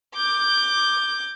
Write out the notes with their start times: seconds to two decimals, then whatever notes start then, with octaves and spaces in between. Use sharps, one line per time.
0.16 D6 G6